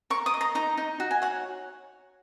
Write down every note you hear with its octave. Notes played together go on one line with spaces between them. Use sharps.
A#4 C#6
D#6
D#5
A#5
D#4 A#5
D#4
F#4
G#5
C#5 F#5